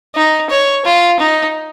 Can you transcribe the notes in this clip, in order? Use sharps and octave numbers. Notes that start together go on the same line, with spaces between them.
D#4
C#5
F4
D#4